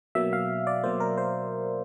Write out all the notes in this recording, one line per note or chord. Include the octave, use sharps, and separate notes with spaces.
B2 F#3 A#3 E5
F5
D5
B2 F#3 A#3 C5
A#4
C5